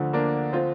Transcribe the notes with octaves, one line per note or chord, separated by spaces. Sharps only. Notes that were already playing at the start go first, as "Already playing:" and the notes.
Already playing: D2 D3 F3
A#3 D4
C4 F4